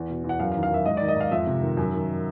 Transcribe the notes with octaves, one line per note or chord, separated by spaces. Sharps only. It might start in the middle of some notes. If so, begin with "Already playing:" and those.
Already playing: E2
B2
E2
F#5
F#2 F5
F5
D#3
F5
F#2 E5
G#2 D#5
D#3 D5
D#5
G#2 F5
F2 E5
C3
D#3
F#2
D#3